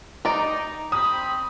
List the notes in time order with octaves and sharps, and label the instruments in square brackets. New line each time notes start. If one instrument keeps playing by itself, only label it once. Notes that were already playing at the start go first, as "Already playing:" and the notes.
[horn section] D#4 [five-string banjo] D5 D#5 [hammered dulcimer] A#5
[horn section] C4 B5 [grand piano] D#6